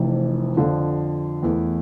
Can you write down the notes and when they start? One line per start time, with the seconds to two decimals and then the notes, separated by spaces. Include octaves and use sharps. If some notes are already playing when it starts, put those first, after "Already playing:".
Already playing: F1 F2 E3
0.57 F2 D3 F3
1.43 E2 E3 A3 E4